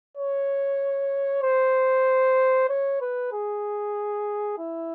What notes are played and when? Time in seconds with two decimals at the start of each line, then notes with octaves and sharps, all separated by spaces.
0.17 C#5
1.43 C5
2.69 C#5
3.01 B4
3.33 G#4
4.58 E4